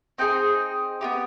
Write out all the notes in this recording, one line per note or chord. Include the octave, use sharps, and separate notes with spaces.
C4 D#4 G#4 G5
B3 D#4 G4